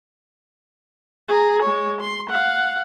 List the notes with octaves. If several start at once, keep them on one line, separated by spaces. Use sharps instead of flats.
G#4 A#5
G#3 C#5
C6
F5 F#5